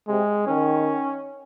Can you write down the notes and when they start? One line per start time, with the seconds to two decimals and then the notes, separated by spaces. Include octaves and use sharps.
0.08 C3 G#3
0.47 D#3 C#4